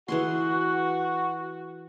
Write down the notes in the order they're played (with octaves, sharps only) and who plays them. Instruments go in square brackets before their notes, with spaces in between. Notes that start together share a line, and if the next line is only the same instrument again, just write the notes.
[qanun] E3 G#4 C6 [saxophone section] F#4